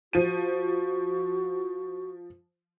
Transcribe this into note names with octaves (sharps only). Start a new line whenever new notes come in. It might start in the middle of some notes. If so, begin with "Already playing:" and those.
F3 F#4 D#7